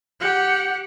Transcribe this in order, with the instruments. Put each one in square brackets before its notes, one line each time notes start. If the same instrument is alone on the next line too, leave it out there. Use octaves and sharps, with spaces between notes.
[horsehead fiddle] G4 F#5